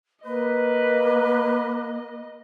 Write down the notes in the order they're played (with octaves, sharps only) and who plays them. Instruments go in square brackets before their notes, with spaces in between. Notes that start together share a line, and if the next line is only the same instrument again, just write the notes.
[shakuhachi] A#3 [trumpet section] B4 [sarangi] D#5